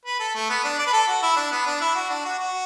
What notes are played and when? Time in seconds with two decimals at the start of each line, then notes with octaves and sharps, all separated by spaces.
0.05 B4
0.20 A4
0.35 A3
0.50 B3
0.64 D4
0.78 D5
0.87 B4
0.93 A4
1.08 F#4
1.22 E4
1.36 D4
1.52 B3
1.66 D4
1.81 E4
1.95 F#4
2.10 D4
2.25 F#4
2.39 F#4